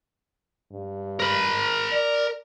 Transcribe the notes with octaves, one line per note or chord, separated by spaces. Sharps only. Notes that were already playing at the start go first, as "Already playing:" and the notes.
G2
A#4 B5
D5